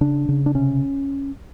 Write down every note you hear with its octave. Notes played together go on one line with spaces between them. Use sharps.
C#3 D4
C#3
D4
C3 C#4